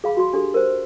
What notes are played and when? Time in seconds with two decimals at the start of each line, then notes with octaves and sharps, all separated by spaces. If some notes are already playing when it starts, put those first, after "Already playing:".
0.04 G#4 F5 B5 D6
0.17 F#4 C6
0.33 D4 G4 A4
0.54 A#4 C5